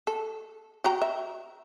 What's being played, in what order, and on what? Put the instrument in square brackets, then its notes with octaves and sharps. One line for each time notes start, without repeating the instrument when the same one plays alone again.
[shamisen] A4
F#4 G5 A#5
E5